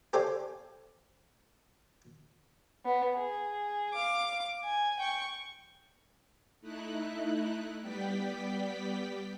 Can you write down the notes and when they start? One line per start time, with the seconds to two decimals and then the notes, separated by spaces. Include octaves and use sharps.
0.13 G4 A4 C5 D5 F5 G#5
2.85 B3
3.15 G#4
3.93 F5 D6
4.64 G#5
4.99 G5 C#6
6.61 A3 D#4 E4 F#6
7.82 G3 B3 D5 G5 B6